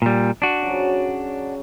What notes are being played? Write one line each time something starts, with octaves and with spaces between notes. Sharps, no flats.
A#2 G3
D4 F#4
C#3 F#3